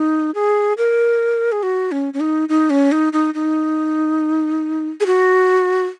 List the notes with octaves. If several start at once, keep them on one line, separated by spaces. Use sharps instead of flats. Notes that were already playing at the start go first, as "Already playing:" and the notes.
Already playing: D#4
G#4
A#4
G#4
F#4
C#4
C#4
D#4
D#4
C#4
D#4
D#4
D#4
G#4
F#4